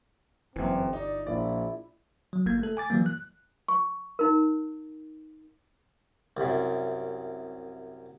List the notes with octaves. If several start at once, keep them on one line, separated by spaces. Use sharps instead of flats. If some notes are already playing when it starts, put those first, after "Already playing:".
G1 F#2 E3 C4
D#4 D5
A#1 E4 D5
F#3
G1 A#3 G#6
A3 A4
G#5 D6 A6
E3 F#3 G3 A#3
F#6
C#6
D#4 A#4
C2 F#2